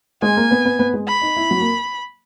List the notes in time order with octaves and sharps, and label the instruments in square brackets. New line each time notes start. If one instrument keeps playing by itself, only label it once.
[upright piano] G#3 G#4 [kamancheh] G#5
[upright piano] A#3 A#4
B3 B4
B3 B4
B3 B4
G#3 G#4
[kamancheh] B5
[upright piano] D#4
E4
F#3 F#4
A#3 A#4